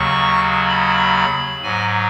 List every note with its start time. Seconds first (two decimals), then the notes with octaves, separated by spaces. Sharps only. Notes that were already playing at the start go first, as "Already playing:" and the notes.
Already playing: D#2 C#3 F#3 C#6
0.69 B5
1.62 G#2 F#3 G#5